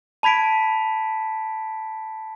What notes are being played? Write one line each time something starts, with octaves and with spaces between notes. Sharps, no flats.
A5 B5 G#6 B6 D7